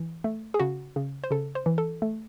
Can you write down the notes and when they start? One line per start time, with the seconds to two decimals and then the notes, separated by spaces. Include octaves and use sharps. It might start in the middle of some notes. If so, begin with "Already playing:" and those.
Already playing: E3
0.24 A3
0.54 G#4
0.60 C#3 F#4
0.96 C#3
1.24 C5
1.31 C#3 A4
1.55 C5
1.66 E3
1.78 A4
2.02 A3